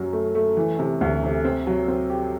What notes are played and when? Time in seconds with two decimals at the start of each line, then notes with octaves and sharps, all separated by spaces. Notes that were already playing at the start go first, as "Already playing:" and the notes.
Already playing: F#2 F#3
0.13 A3
0.35 A3
0.57 E3
0.79 C3
1.01 D2
1.23 C3
1.45 C4
1.67 F#3
1.88 C4
2.10 G4